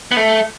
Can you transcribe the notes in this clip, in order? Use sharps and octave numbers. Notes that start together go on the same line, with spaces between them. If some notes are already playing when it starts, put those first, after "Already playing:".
B3
A3